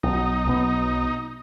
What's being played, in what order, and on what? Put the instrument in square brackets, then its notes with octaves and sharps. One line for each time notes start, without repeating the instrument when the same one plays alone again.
[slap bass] B1 [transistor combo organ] D#4
[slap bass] B1 F#3 B3